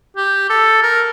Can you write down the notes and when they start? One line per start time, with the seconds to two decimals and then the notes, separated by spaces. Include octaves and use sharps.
0.17 G4
0.50 A4
0.83 A#4